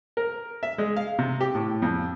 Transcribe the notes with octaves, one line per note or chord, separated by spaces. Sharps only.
A#4
E5
G#3
F5
C3
G4
A2
F2